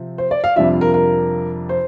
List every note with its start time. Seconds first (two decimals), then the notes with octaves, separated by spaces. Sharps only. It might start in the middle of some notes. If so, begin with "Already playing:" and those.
Already playing: C3 F3 C4
0.18 C5
0.31 D5
0.44 F5
0.56 F2 C3 G3 D4 F4 E5
0.81 A#4
0.94 A#4
1.69 C5